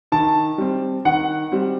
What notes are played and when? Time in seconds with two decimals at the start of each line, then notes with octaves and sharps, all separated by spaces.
0.12 D#3 A5
0.58 G3 C4
1.05 D#3 F#5
1.52 G3 C4